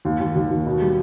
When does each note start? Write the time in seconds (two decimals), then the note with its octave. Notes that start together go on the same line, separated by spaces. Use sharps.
0.05 D#2
0.20 D#2
0.36 D#2
0.51 D#2
0.66 B2
0.81 G3